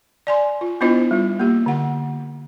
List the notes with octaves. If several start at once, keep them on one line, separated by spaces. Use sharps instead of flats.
D5 G#5 C6
F4
B3 D4 E4 F4 C5 D#5
G3 F4
A#3 G4
D3 F#5